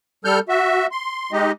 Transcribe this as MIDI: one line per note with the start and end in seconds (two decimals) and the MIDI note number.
0.25 0.39 55
0.25 0.39 69
0.25 0.39 89
0.25 0.39 91
0.49 0.87 66
0.49 0.87 76
0.92 1.32 84
1.32 1.52 56
1.32 1.52 63
1.32 1.52 67
1.32 1.52 75